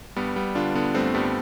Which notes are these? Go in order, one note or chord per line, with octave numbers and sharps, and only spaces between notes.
G2 G3 B3
G2 G3 B3
D3 D4 F4
D3 B3 D4
G2 A3 C4
G2 G3 B3